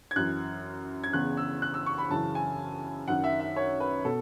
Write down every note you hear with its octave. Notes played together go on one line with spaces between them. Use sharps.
G#6
F#2 E3 F#6
G#6
E2 C#3 E3 F#6
E6
F#6
E6
C#6
B5
F#2 C#3 E3 A5
G#5
F#2 D#3 F#5
E5
E5
C#5
B4
B2 A4